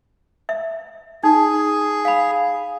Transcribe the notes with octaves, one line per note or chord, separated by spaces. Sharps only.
E5
D#4 G#4
F5 B5